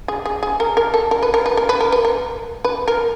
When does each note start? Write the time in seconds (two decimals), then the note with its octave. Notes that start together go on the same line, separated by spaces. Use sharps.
0.08 G#4
0.26 G#4
0.43 G#4
0.60 A#4
0.77 A#4
0.94 A4
1.11 A#4
1.23 B4
1.34 A#4
1.46 B4
1.57 A#4
1.69 B4
1.81 A#4
1.92 B4
2.05 A#4
2.65 B4
2.88 A#4